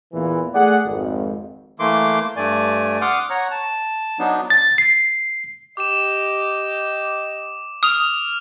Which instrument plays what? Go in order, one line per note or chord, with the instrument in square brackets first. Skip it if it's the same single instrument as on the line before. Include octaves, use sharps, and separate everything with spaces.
[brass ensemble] E2 A#2 E3
A3 G#4 D5 F#5
G#1 F2
[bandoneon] E3 A3 A#3 C6 D6
G2 A3 D5 G#5
F#5 C6 D6 D#6 F6
C#5 F#5 A#5
A5
F#3 B3 D4 D#4
[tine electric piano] A6
C7
[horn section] G4 D#5 [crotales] D6 E7
[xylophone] D#6 [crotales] F6 F7